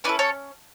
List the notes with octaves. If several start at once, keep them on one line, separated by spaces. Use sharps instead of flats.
C#4 E4 A4 B4 D5
A4 C#5